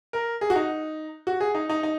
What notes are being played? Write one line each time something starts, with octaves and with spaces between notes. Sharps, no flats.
A#4
G#4
F#4
D#4
F#4
G#4
D#4
D#4
D#4